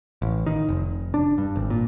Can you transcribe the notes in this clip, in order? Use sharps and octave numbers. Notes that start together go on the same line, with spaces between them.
A1
D#3
F1
D4
G2
G#1
A#2